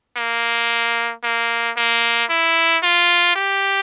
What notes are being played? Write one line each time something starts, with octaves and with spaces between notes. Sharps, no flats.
A#3
A#3
A#3
E4
F4
G4